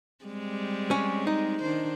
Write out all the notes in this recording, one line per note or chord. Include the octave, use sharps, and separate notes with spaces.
G3 G#3 C4
C#4
D#4
D#3 D4 C5